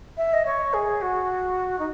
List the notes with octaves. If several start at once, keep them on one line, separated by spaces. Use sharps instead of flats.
E5
D#5
C#5
G#4
F#4
D#4